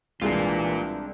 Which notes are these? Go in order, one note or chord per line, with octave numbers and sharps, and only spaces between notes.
C2 E3 G#3 D4 F4 A#4 C7